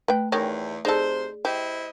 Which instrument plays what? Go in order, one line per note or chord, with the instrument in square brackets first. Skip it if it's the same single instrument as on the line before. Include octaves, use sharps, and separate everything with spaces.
[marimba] A3 [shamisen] B4 G5
[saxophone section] E2 [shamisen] D#3 C#4 G4 [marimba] A#6
[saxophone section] C3 C5 [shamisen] D#4 A4 [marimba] G#4 D5 F#6
[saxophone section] E4 C5 D#5 [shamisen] G4